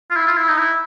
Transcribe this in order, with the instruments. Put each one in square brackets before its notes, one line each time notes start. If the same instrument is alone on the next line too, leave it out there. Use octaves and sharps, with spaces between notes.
[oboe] F4
E4
F4
E4
D#4
E4